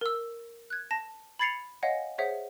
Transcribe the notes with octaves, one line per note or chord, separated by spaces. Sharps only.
A#4 E6
F#6 G#6
A5 A#6
B5 G#6 A6 C7 C#7 F7
C#5 D#5 F5 F#5 G#5
G#4 C5 C#5 E5 F#5